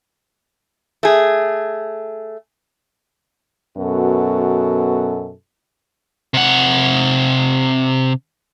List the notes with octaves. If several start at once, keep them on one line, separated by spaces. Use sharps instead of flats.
A3 G#4
F#2 B2 B3 F#4 A4
C3 F#5